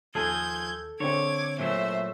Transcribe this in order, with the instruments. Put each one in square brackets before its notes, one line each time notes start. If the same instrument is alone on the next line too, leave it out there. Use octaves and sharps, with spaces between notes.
[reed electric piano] D#2 [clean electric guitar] F3 G#4 [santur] A4 [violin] G6 G#6
[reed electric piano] D3 C4 [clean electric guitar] C#5 [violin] D6 G#6
[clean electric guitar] A#2 F#3 A3 [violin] C5 E5